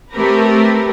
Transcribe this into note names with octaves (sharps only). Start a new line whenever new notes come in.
A3 C4 G4 A#4 B4